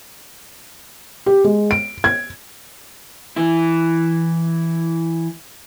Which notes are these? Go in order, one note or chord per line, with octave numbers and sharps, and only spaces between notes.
G4
G#3
D7
G#6
E3 E4